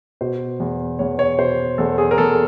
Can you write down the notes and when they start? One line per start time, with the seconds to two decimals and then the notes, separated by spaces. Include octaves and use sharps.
0.21 B2 C5
0.60 E2
0.99 E2 C#5
1.19 C#5
1.39 B2 C5
1.78 E2 A4
1.98 G#4
2.11 A#4
2.18 E2 A4